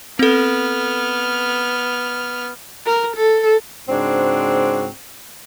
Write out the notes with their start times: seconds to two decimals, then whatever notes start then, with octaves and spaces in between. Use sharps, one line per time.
0.19 B3 C4 A4 F6
2.86 A#4
3.16 A4
3.88 G#2 C#3 C4 D4 F#4